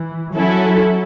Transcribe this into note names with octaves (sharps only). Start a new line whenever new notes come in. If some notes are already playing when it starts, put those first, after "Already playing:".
Already playing: E3
F#3 C#4 E4 A4